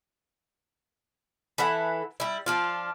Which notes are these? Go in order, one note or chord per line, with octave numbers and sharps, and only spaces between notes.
E3 E4 A4 F#5
G3 E4
F3 D4 F4